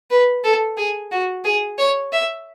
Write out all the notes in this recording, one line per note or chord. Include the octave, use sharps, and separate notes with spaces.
B4
A4
G#4
F#4
G#4
C#5
E5